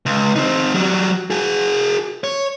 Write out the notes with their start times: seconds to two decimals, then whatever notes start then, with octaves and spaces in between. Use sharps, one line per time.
0.06 C#2
0.36 C4 D#4
0.74 F#3 G3
1.30 F#4 G#4
2.24 C#5